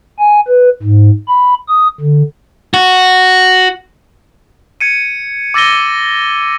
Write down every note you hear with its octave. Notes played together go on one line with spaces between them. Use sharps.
G#5
B4
G#2
B5
D#6
D3
F#4
G#6 C#7 D#7
D6 E6 A6 A#6 D#7 G7